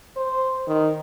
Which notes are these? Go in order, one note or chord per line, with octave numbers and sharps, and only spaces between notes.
C5
D#3